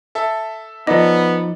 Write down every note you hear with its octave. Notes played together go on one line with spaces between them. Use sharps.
A4 E5 A5
F3 B3 D#4 A4 D5 D#5